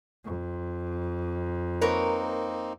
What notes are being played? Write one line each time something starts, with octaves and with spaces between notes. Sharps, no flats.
F2
A#3 C4 D#4 A#4 B4 C#5